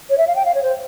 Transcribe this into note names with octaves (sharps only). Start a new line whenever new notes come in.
C#5
E5
F5
G5
F5
C#5
C5